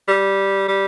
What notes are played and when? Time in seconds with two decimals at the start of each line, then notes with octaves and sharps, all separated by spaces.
0.08 G3
0.68 G3